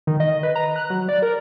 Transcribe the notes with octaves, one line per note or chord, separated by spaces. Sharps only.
D#3
D#5
B4
A#5
F#6
F#3
D5
A#4